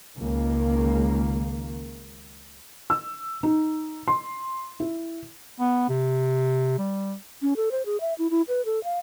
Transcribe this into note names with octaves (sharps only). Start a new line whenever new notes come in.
C#2 D#3 A#3
E6
D#4
C6
E4
B3
C3
G3
C#4
A4
C5
G#4
E5
E4
E4
B4
A4
F5